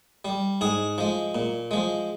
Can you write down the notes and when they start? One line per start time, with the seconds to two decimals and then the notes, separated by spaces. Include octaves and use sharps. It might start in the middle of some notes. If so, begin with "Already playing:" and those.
0.25 G3
0.61 G#2 G#4
0.98 F3 G#3
1.35 A#2
1.71 F3 G#3